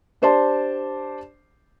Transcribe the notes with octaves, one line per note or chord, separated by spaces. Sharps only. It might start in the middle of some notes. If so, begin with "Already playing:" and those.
D4 G4 C5 D5 A5 C6